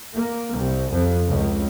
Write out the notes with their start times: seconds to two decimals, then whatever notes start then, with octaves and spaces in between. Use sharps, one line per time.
0.15 A#3
0.56 C2
0.91 F2
1.30 C#2